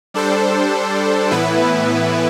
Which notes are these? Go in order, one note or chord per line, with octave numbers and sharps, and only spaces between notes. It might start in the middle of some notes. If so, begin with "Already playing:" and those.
G3 D4 A4 C5
A2 E3 B3 E4 B4